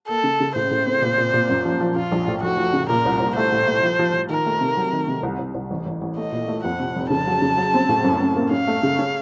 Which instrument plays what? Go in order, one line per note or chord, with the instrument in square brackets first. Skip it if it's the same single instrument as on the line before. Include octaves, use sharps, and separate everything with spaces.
[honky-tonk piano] A#3 [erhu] A4
[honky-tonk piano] C#3
C#3
[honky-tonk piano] A2 [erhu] C5
[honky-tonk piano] A2
C4
A#2
A#2
A#2
F#2
F3
F3
[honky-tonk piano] F3 [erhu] F4
[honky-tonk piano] A#1
A2
[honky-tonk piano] F1 [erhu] F#4
[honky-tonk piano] F3
C#3
[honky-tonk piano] A#2 [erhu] A#4
[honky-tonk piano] C2
C2
[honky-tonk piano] A3 [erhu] C5
[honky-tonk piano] A2
A3
F3
F3
F3
[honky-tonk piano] D#3 [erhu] A#4
[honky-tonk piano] A3
C3
F#3
D#3
C3
C2
C2
C2
A1
A1
A1
[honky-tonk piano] A3 [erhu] D#5
[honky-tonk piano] A#2
A3
[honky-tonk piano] F2 [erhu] F#5
[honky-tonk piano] C3
F1
[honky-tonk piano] C#3 [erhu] A5
[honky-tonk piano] F#3
C#3
F#3
C4
A2
F#2
F#2
A#3
[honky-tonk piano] C#4 [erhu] F5
[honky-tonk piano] A3
C#3
C#4